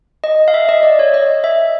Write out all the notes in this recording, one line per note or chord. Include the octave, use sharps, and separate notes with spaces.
D#5
F5
E5
D#5
D5
C#5
D#5
E5